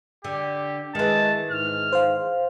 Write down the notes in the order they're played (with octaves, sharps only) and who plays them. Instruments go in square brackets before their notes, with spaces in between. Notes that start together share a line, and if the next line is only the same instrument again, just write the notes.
[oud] D3 [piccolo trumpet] G4
[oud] D#3 E3 [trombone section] G#3 [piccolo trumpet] A5
[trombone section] G#2 [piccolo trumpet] F6
[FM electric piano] C5 F5